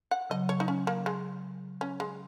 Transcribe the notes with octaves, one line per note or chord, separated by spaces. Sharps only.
F#5
C#3 F#3 D#5
C#5
D#4
C#4
A#3
G#3
C#4
G#3